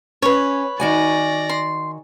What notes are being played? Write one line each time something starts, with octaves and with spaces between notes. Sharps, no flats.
C#4 B4 C#5
D#3 F#4 D5 G#5 A#6
C6